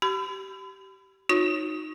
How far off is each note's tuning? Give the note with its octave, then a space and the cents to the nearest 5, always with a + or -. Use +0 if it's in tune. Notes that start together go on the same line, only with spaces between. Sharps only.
G4 -25 B5 +40
D#4 +0 F#4 -40 C#5 +0